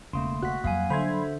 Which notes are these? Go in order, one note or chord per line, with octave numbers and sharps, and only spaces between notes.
E1 C#3 A3 A#3 C6
F#4 F#6 B6
F2 F#3 G3 A#3 F5 G#5
D3 C5 E5 B5 C6 G#6